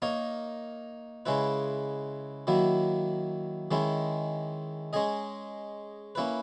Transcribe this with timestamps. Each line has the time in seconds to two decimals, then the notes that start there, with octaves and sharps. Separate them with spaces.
0.02 A#3 D#4 A#4 C#5
1.26 C#3 G#3 C#4 E4 B4
2.47 D#3 F#3 A#3 E4
3.71 D#3 G#3 C#4 E4
4.93 G#3 C#4 G#4 D#5
6.15 A#3 C#4 E4 B4